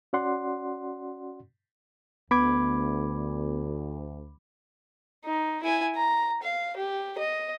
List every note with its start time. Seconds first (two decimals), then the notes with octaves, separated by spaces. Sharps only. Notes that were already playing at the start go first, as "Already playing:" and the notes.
0.13 C#4 F#4 D5 F#5 C6
2.31 D2 B3 B5 D6 G#6
5.24 D#4
5.63 E4 G#5
5.96 A#5
6.43 F5
6.77 G4
7.18 D#5